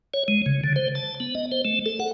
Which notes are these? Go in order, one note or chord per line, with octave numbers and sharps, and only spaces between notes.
C#5
G#3
C#3
D3
C5
A5
B3
D#5
C5
A3
A4
F#5